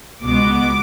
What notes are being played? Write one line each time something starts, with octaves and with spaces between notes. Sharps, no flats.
C#2 B2 G#3 B3 D6